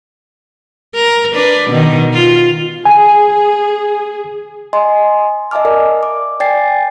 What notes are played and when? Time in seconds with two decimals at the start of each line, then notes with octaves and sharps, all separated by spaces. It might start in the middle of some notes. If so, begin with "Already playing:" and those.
0.95 A#4
1.33 D4 B4
1.70 B2 D#3
2.13 F4
2.85 G#4 G#5
4.73 D#5 G#5 C6
5.51 D#5 E5 G#5 A5 D6 F6
5.65 A#4 D5 D#5
6.03 D6
6.40 D5 G5 G#5 A6 C7